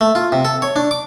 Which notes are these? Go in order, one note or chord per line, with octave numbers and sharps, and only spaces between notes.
A3
F4
C3
A4
C#5
D4
D6